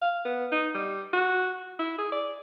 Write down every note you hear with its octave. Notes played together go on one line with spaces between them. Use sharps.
F5
B3
D#4
G3
F#4
E4
G#4
D5